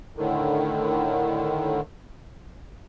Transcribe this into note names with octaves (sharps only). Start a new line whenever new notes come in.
A2 D3 D#3